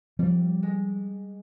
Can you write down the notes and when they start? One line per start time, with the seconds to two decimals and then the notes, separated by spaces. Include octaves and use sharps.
0.19 F3 G3 C4
0.63 G#3